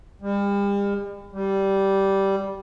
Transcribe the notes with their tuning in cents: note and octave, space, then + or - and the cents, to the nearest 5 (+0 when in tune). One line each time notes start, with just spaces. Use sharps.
G3 +40
G3 -10